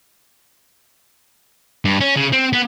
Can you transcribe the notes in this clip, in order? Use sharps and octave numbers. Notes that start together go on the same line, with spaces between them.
G2
C#4
C#3
C4
B3